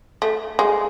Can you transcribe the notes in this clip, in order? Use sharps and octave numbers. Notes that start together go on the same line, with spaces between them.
A3
G#3